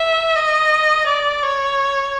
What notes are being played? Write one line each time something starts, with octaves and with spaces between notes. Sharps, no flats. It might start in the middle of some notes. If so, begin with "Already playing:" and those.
Already playing: E5
D#5
D5
C#5